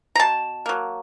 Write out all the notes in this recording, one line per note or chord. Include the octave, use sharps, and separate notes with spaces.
A#5
B2 A5
F#3 A#3